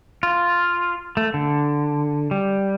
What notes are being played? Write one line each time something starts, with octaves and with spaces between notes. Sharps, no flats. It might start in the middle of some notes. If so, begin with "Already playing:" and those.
F4
A3
D3
G3